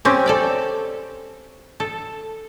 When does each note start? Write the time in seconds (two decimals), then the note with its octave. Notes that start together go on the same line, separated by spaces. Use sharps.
0.05 C4 C#4 G4
0.26 A4 D5 G5
1.80 A4